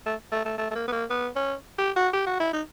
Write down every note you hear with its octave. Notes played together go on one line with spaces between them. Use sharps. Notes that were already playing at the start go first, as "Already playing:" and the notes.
A3
A3
A3
A3
A3
A#3
B3
A#3
B3
C#4
G4
F#4
G4
F#4
E4
D#4